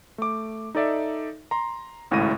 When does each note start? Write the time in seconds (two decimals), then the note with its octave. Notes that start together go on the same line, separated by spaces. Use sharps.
0.18 A3 D6
0.75 D#4 A4 D5 E5
1.51 A#5 C6
2.11 G#1 C#2 A2 E4 A#6 D#7